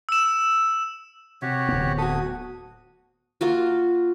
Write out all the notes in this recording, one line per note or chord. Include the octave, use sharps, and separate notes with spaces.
E6 E7
C3 F#4 G4 C#5
D1 B3
F#4 A4 D#6
A#3 F4 F#4